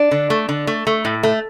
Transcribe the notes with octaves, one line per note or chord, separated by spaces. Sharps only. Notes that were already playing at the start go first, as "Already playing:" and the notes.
Already playing: D4
D3
A3
D3
A3
A3
A2
A3